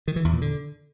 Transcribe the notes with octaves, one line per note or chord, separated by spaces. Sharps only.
D#3
E3
E2
A#2
D3